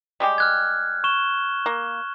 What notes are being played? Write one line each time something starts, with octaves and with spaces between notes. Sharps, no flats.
G3 G#3 G4
F6 F#6 G#6
C#6 E7 G7
A#3